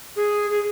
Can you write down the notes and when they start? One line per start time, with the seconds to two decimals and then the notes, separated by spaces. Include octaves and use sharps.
0.16 G#4
0.51 G#4